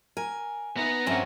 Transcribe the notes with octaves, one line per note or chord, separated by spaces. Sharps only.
A#4 G#5
B3 D#4 B4 E5 A#5
G2 F3 C4 C#4 F#4 A#4 E5 G#5